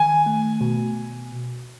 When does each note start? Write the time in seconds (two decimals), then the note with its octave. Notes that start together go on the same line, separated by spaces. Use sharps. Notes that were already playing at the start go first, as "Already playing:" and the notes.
Already playing: D#3 G#5
0.26 A3
0.61 B2